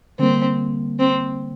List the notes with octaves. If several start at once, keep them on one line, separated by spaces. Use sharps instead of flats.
D3 G3 A#3 C4
C4